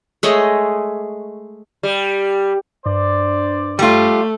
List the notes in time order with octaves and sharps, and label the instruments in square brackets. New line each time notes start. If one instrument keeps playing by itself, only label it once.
[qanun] G#3 A3 C#5 D#5
[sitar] G3
[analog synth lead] G2 [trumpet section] C5 D5
[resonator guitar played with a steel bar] G3 F4 [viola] A3